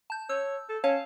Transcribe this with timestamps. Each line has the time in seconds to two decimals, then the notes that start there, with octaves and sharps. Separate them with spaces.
0.10 A5 G6
0.29 C#5 E6
0.69 A4
0.84 C#4 C#5 F5 A5